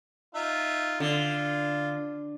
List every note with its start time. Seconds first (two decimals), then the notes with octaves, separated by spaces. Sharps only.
0.35 D#4 F4 E5
1.00 D3 F4